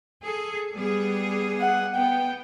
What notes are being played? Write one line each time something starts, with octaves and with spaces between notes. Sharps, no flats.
G#4 A4
G3 B3 G#4
F#5
B3 G5